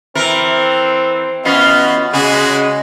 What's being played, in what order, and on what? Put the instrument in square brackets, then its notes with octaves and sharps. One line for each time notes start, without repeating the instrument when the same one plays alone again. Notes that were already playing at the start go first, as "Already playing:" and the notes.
[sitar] E3 A#4 [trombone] C4
[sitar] E3 C#4 F4 [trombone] B3 [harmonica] F#4 B4 [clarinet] D#5
[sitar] C#3 [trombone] G#3 [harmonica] F#4 G#4